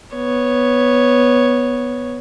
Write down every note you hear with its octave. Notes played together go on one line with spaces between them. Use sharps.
B3 C#5